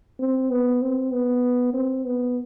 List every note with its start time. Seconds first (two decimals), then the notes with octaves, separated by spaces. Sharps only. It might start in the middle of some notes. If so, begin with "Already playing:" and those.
0.19 C4
0.50 B3
0.82 C4
1.12 B3
1.74 C4
2.05 B3